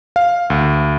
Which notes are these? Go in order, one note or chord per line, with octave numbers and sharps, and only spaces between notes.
F5
D2